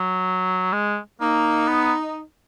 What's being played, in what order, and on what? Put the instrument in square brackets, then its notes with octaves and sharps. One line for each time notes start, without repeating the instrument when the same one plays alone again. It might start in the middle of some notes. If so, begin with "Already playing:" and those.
Already playing: [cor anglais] F#3
G#3
[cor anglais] A#3 [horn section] D#4
[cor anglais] B3